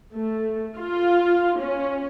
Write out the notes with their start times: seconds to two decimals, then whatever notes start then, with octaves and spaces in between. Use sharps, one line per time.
0.13 A3
0.76 F4
1.60 C#4